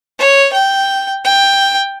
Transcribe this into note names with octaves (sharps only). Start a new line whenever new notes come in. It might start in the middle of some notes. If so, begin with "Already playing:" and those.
C#5
G5
G5